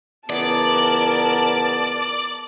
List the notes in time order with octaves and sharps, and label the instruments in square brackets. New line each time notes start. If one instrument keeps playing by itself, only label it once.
[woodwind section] C#2 E3 B3 [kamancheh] A#4 A5 [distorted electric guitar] D5